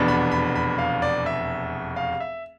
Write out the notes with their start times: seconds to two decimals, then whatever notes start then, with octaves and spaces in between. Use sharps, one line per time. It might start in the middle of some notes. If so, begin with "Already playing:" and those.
Already playing: F1 E2 B2 B3 D4
0.08 B5
0.31 B5
0.56 B5
0.78 F5
1.02 D5
1.26 E5
1.96 F5
2.20 E5